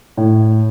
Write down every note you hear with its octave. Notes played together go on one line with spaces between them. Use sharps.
A2